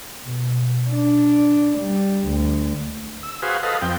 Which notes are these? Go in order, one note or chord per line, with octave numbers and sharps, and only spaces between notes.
B2
D4
G3
D2
E6
F#4 G#4 B4 C5 F5
A4 B4 D#5 F5
F2 C4 G5